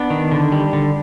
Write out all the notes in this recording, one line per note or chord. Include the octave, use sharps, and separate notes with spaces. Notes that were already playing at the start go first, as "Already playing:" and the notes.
Already playing: B3 D4
D#3
D3
G3
D3